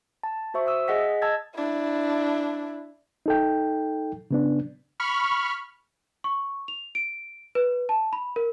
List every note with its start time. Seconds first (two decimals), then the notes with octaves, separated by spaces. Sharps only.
0.23 A5
0.54 F#4 C5 E5 C#6
0.66 E5 D#6 E6
0.88 G#4 D#5 F#5 B6
1.22 D#5 A5 E6 G#6 A6
1.55 D4 E4
3.26 D#4 A4 G5
4.31 C#3 B3 D4
5.00 B5 C#6 F6
6.24 C#6
6.68 F7
6.95 D7
7.55 B4
7.89 A5
8.13 B5
8.36 A#4